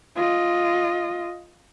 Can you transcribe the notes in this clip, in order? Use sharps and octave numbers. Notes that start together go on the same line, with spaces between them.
F4 D#5